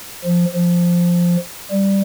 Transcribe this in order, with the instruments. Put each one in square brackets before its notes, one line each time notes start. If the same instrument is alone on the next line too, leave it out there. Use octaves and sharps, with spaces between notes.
[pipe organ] F3
F3
G3